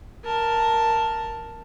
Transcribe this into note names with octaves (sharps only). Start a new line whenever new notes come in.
A#4 A5